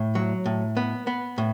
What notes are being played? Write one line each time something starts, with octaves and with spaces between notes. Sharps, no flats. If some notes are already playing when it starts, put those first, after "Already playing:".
Already playing: A2
F#3
A2
B3
B3
A2